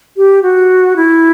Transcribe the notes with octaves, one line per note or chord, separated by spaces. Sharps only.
G4
F#4
E4